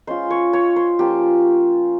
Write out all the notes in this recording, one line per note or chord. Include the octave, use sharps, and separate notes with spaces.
G#3 C#4 F4 C5
C#5
C#5
C5
F3 A#3 C#4 F4 G4